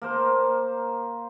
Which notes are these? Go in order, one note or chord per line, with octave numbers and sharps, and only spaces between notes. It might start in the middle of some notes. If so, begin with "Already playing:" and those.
A#3 A#4 C5